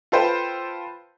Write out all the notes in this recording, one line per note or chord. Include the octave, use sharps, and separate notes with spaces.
F4 A4 B4 C5 G5